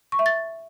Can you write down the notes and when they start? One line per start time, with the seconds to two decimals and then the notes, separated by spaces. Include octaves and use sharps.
0.12 C#6
0.19 E5
0.26 A6